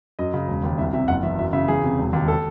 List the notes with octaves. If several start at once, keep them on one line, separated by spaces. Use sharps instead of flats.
F#2 D#5
C#3
E1
D#2
C2 E5
C3 E5
F#1 F#5
E2 E5
F#2 E5
C#3 E5
E2 G#4
C3
E1
D#2
A4